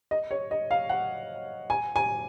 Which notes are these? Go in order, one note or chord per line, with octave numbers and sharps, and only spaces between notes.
D#5
C#5
D#5
F5
F#5
G#5
G#5